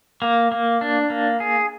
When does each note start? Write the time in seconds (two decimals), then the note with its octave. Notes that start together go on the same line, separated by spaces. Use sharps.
0.22 A#3
0.52 A#3
0.81 D4
1.10 A#3
1.40 G#4